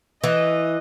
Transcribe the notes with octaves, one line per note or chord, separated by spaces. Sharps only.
E3 D#5